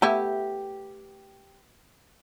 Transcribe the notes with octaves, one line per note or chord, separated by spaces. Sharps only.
A3 B3 E4 G4